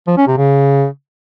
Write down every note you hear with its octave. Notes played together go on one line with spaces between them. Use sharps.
F3
C#4
C3
C#3